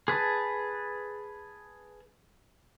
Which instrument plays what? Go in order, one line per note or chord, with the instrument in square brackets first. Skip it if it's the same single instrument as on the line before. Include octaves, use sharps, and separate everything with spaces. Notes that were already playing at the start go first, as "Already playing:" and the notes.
[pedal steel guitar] G#4 B4 A5